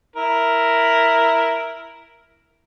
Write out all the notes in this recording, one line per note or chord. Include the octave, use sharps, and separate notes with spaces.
E4 A#4